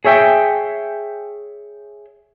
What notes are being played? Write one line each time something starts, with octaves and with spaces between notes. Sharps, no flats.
G#4 C#5 E5 G5